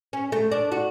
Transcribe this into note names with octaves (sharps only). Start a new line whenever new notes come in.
C#4
A3
D4
F#4